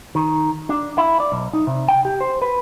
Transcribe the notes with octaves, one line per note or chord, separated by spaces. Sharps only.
D#3
D4
E4
D5
B1
D#4
C3
G5
G4
C5
B4